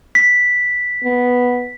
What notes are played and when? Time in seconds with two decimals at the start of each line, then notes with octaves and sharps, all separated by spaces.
0.15 B6
1.05 B3